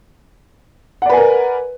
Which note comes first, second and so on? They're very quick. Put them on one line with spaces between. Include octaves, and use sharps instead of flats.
F#5 D5 B4 G#5 A#4